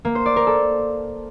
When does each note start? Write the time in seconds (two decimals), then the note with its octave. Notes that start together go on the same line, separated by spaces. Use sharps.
0.05 A#3
0.15 C5
0.26 D5
0.36 A#4
0.47 A4